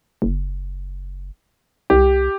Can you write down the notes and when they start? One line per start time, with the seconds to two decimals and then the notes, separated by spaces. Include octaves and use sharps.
0.22 F#1
1.90 C2 G4